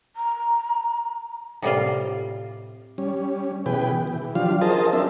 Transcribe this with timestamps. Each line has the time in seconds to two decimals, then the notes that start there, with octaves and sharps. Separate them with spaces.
0.16 A#5
1.62 A2 C3 G3 F4
2.98 G3 C#4
3.66 B2 E3 G#4 B4 G5
4.07 E3
4.35 F3 F#3 D4 F4 G4 F5
4.61 G#4 A#4 C5 D#5 A5
4.93 F#3 C4 D4 F4 A#4 E5